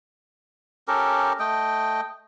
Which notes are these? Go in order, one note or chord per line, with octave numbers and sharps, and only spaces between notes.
C#4 G4 A4 A#4
A3 D#5 G5